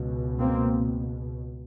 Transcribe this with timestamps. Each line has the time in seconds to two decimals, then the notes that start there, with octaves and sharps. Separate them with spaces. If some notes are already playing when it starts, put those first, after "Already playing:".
Already playing: C#2 B2
0.40 A#3 C4